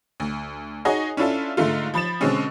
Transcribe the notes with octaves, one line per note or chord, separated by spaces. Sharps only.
D2
D#4 F#4 G#4 C#5 D#5 G#5
C#4 D4 E4 F4 A4
G#2 D3 G#3 A3 F4
F3 B5 A6 E7
B2 D3 G#3 C4 C#4